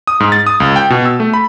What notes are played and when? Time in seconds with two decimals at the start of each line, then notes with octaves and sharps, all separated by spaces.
0.07 D#6
0.20 G#2
0.32 A6
0.47 D#6
0.60 C#2
0.76 G5
0.90 B2
1.05 E6
1.20 A3
1.34 B5